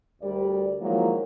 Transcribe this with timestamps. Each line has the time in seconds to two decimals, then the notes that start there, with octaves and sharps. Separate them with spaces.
0.22 D2 G3 A#4 D5
0.81 D#3 F3 F#3 G#3 A#3 E4